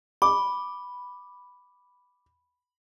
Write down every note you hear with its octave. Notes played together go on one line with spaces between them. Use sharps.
B5 D6